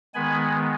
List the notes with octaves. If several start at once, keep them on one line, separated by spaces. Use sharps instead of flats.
D#3 G#3 B3 G#5 B5